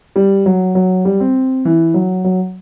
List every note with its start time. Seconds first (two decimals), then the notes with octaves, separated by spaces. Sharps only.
0.16 G3
0.46 F#3
0.75 F#3
1.05 G3
1.20 C4
1.65 E3
1.94 F#3
2.24 F#3